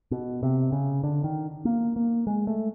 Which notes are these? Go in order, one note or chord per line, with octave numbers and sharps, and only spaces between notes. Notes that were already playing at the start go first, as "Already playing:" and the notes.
B2
C3
C#3
D3
D#3
A#3
A#3
G#3
A3